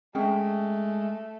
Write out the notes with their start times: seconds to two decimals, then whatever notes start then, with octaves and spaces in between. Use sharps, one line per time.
0.15 G#3 A3 C#4 G#4 G5